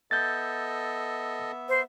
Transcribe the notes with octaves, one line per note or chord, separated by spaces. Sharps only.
B3 A4 D#5 E5 G6 A6
C5